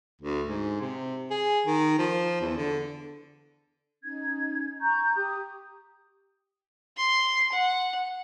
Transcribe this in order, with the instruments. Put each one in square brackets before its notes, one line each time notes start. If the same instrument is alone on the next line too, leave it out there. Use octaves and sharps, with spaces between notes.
[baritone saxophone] D2
G#2
C3
G#4
D#3
F3
E2
D3
[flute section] C#4 D#4 G#6
A#5 C#6 G6
G4 D#6
[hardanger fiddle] C6
F#5